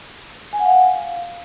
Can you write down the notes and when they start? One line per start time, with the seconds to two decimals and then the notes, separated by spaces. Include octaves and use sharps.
0.53 G#5
0.59 F#5
0.66 F5